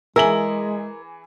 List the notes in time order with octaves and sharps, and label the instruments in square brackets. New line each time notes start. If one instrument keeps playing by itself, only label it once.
[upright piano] E3 G#4 F#7 [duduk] G#3 [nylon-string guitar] A#4 [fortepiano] E5